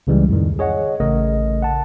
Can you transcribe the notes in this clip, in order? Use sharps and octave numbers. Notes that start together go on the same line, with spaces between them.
C#2 C#3 E3 G3 G#3
F2 A2 D#3
G#4 C#5 D#5 F#5
A1 C#3 A3 A#4 D#5
F#5 A5